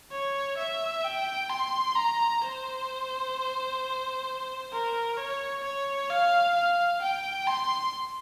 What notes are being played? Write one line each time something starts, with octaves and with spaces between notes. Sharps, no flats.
C#5
E5
G5
C6
A#5
C5
A#4
C#5
C#5
F5
F5
G5
C6